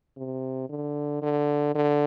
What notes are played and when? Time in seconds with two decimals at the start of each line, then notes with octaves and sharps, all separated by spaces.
0.17 C3
0.70 D3
1.22 D3
1.75 D3